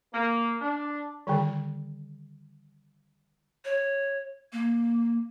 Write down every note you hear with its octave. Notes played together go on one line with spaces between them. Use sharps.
A#3
D4
D3 D#3 G3
C#5
A#3